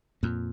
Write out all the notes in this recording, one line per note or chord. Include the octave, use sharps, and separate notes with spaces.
F2 A#2